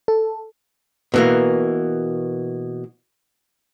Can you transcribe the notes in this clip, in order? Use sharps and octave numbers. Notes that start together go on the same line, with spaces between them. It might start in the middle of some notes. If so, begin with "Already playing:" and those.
A4
B2 E3 A#3